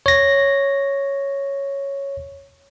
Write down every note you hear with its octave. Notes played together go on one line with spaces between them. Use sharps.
C#5 A#6